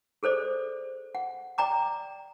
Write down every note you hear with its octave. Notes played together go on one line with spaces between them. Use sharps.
G#4 A4 C5 D5
F#5
D5 G5 A#5 D6